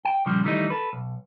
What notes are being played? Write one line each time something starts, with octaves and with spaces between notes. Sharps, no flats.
G5
A#2 C#3 F3 G3
D#3 E3 G3 A3 B3 D#4
A4 B4
B1